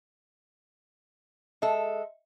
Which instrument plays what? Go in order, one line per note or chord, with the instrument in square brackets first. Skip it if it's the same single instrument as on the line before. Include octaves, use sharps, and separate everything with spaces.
[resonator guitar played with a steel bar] G#3 A4 [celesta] D#5 E5